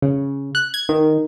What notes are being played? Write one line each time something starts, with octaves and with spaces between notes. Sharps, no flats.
C#3
F#6
G#6
D#3